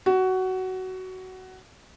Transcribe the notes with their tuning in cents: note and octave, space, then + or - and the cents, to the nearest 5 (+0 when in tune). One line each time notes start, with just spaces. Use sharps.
F#4 +15